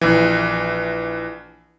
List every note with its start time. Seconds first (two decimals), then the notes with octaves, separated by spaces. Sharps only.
0.01 A#1 E3